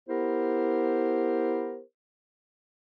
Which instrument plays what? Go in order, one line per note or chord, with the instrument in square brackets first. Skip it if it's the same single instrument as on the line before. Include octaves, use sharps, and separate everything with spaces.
[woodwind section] B3 E4 G4 A#4 C5